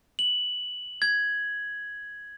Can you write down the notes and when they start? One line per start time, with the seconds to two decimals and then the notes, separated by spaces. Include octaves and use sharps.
0.19 F#7
1.02 G#6